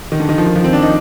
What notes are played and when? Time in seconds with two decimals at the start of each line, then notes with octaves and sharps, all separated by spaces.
0.12 D#3
0.20 D3
0.29 D#3
0.38 F3
0.46 D#3
0.56 F3
0.64 C4
0.73 D4
0.83 D#4